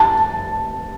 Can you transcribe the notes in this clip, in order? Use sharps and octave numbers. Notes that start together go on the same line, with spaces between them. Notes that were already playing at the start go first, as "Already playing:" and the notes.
Already playing: A5